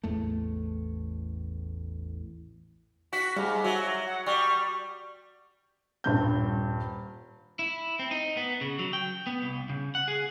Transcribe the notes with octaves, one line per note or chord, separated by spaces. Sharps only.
A1 E2 A2 A3
F#4 B6
G#2 G3 F5
F#3 F#4 E5
F#5
G3 C#6
D#1 G2 G6
E4
C4
D#4
B3
C#3
F#3
G5
B3
C2
C#3
F#5
G#4